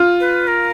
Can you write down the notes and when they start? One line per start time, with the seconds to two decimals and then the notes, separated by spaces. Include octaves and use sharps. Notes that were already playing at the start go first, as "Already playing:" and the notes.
Already playing: F4
0.20 B4
0.47 A#4